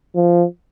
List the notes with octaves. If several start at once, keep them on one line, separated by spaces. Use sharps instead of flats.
F3